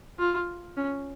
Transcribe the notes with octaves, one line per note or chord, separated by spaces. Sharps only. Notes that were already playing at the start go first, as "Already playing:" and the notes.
F4
C#4